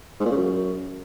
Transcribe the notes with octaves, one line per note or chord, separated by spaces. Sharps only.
G#2
A#2
C#3
F#2